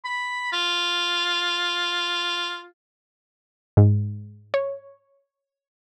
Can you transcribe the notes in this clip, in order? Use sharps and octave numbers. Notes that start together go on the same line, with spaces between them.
B5
F4
G#2
C#5